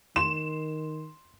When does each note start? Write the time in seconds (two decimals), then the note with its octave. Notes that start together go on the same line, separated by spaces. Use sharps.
0.16 D#3 C6 E7